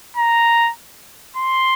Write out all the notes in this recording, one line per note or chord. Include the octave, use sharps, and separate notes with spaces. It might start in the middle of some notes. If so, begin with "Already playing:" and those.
A#5
C6